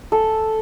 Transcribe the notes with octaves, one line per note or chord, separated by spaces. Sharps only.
A4